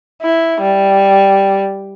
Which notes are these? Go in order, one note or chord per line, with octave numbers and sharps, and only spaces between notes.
E4
G3